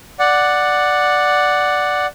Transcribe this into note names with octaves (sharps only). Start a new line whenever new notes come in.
D5 F#5